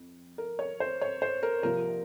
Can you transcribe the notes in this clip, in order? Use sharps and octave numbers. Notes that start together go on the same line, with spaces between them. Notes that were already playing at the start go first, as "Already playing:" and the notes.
Already playing: F2
A#4
C#5
C5
C#5
C5
A#4
C2 C3 F3 A#3 F4 A#4